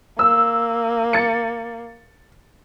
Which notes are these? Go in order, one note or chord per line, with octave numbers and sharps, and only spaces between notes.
A#3 E6
A6 C#7